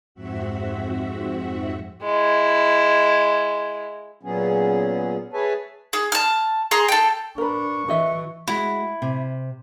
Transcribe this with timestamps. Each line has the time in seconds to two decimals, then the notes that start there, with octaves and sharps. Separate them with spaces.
0.14 F2 G#2 C4 F#4 E5 F#5
2.02 G#3 E4
4.23 A#2 F#3 B3 C#4 G#4
5.33 G#4 B4 C#5 E5 G#5 A5
5.93 G#4
6.12 A5 F6
6.71 G#4 A#5 C6
6.88 A4 G5
7.38 D4 A#4 B4 C#6
7.88 E3 F#4 D#5 E5
8.48 G#3 E4 F#4
9.02 C3